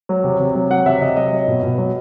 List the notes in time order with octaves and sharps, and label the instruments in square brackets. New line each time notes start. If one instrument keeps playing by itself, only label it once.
[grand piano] F#3
C3
C3
F#3
F#3 F#5
C3 E5
C3 D#5
F#3 D#5
F#3
B2
B2
F#3